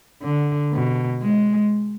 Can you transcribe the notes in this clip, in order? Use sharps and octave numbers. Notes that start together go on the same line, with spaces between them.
D3
B2
G#3